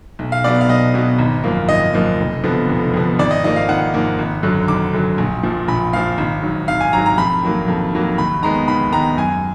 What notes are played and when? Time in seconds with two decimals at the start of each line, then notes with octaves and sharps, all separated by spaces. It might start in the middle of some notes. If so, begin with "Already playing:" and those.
0.19 B1
0.32 F5
0.44 B2 F#3 B3 D5
0.61 F5
0.69 B1 D#5
0.94 B2 F#3 B3
1.19 G#1
1.43 F#2 F3 A#3
1.69 G#1 D#5
1.94 F#2 F3 A#3
2.19 F1
2.44 F2 D3 F3 B3
2.69 F1
2.94 F2 D3 F3 B3
3.19 G#1 D5
3.31 D#5
3.43 G#2 F3 A#3 D#5
3.56 F5
3.68 G#1 F#5
3.94 G#2 F3 A#3
4.19 G#1
4.43 F#2 D3 F#3
4.68 G#1 D6
4.93 F#2 D3 F#3
5.18 A#1
5.43 A#2 F3
5.68 A#1 B5
5.93 A#2 F3 F5
6.18 G#1
6.43 G#2 F#3
6.68 G#1 F5
6.81 G#5
6.93 G#2 F#3 A#5
7.06 A#5
7.18 F2 B5
7.42 D#3 F#3 A#3
7.68 F2
7.93 D#3 F#3 A#3
8.18 D#2 B5
8.42 D#3 G#3 B3 A#5
8.68 D#2 B5
8.92 D#3 G#3 B3 A#5
9.17 F#2 G#5